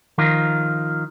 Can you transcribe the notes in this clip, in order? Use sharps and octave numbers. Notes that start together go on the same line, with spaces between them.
D#3 F3 F4 A#4